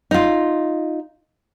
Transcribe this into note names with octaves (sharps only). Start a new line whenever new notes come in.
D#4 F4